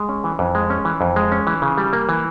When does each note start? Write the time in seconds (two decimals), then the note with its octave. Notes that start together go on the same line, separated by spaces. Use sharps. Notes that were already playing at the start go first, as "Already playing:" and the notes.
Already playing: G#3
0.09 C#4
0.24 E3
0.39 F2
0.55 G#3
0.70 C#4
0.85 E3
1.01 F2
1.16 G#3
1.32 C#4
1.47 E3
1.62 C#3
1.78 G3
1.93 A#3
2.09 E3